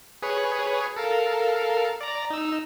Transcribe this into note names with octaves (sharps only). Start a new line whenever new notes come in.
G#4 B4 C#5
A4 A#4 F5
D5 A#5
D#4 E6